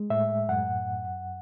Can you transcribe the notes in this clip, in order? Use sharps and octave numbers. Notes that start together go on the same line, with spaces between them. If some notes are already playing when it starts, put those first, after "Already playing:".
Already playing: G#3
A2 E5
F#2 F#5